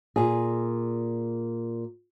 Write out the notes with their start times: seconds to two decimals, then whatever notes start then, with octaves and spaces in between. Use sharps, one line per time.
0.16 A#2 G#4